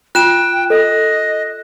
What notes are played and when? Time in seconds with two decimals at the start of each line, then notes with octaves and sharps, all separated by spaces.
0.15 F4 G5 F#6 E7
0.70 A4 D#5